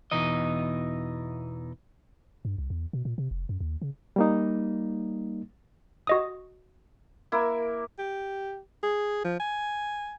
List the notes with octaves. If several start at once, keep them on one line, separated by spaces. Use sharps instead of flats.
E2 B2 E3 D#4 D#5
G2
C2
E2
B2
A#2
C3
F1
F#2
D#2
C#3
G3 A#3 D#4
F#4 D#5 D#6
A#3 E4
G4
G#4
F3
G#5